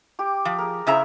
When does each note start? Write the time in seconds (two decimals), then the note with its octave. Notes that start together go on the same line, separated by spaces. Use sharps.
0.19 G4 D6
0.45 F3
0.58 G#4 A#4
0.87 C#3 E4 G#4 C5 E5 A#5